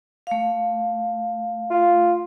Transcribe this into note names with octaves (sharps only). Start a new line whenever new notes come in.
A3 F5
F4